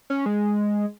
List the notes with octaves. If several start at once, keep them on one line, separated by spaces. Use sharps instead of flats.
C#4
G#3